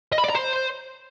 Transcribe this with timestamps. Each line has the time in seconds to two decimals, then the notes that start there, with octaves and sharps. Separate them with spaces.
0.12 D#5
0.18 B5
0.24 D5
0.29 A#5
0.35 C5